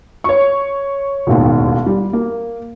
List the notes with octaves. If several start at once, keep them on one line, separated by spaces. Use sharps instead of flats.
C#5 C#6
E1 A1 D#2
G3
A#3